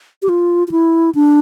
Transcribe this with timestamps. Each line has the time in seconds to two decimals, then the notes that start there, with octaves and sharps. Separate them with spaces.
0.22 G4
0.29 F4
0.68 F4
0.71 E4
1.15 D4